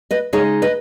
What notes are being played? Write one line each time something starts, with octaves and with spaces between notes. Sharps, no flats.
B4 D#5
C#3 G#3 D#4 G#4 C#5
B4 D#5